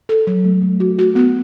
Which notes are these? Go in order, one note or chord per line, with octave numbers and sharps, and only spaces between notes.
A4
F#3
A3
A3
F#4
F#4
B3